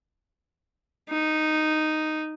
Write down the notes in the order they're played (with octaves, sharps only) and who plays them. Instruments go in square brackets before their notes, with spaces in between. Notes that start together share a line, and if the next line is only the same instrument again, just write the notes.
[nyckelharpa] D#4